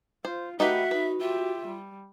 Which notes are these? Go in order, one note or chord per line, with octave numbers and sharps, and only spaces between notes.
F4 C5
A3 D#4 F#4 G4 B4 E5 F#5
D#4 B4
F4 G4 E5
G3